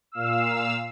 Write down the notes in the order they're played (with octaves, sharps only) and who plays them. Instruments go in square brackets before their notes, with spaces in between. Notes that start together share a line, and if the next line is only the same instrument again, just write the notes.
[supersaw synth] A#2 F5 E6